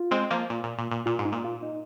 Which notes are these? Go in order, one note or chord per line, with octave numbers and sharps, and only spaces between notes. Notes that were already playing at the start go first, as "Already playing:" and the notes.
Already playing: F4
G#3 C4
F3 A#3
A#2
A#2
A#2
A#2
A#2 F4
G#2
D#4
A#2
F4
D#4